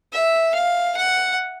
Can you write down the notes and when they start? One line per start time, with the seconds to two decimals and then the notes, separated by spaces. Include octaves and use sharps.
0.13 E5
0.55 F5
0.97 F#5